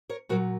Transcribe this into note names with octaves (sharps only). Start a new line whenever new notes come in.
A#4 C#5
A#2 F#3 F#4 A#4